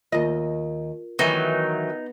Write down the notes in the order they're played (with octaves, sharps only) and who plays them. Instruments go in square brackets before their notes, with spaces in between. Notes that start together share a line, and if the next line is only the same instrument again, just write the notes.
[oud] D#2 D#5 [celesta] F4 A#4
[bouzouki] D#3 E3 F#3 [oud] B3 [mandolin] D#4